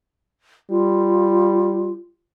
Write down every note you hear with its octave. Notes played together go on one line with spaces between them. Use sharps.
G3 F4